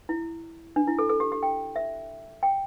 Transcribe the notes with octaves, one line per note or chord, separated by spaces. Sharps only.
E4
D4
E4
A4
A4
G4
G4
G5
E5
G5